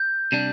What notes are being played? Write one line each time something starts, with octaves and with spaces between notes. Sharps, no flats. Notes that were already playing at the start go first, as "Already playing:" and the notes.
Already playing: G6
C3 G3 D4